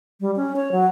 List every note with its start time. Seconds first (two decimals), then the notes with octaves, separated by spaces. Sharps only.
0.21 G3
0.36 C#4
0.56 C#5
0.72 F#3